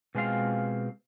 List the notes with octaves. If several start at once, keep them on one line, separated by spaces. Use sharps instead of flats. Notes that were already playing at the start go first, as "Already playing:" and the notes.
B2 G#3 C4 F4 F5